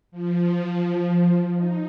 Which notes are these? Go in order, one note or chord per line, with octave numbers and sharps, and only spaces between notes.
F3
D#4